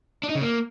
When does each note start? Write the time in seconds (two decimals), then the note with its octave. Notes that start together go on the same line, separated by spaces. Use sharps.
0.23 D4
0.29 D#4
0.35 C#3
0.41 A#3